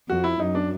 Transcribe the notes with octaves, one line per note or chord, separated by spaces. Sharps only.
F2 F#4
E4
F#2 D#4
D4